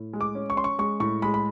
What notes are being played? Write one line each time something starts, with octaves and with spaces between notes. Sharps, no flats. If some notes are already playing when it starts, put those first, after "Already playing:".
Already playing: A2
G#3
D6
C#4
C#6
C#4 C6
C#6
G#3 C#6
A2 C#6
G#3 B5
B5